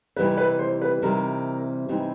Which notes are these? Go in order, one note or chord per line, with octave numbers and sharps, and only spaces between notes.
C3 E3 G3 C4 D#4 B4
B4
C5
B4
C3 E3 G3 C4 D#4 A#4
C3 E3 G3 C4 D#4